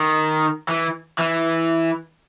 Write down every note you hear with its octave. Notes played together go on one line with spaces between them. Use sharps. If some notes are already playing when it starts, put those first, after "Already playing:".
Already playing: D#3
E3
E3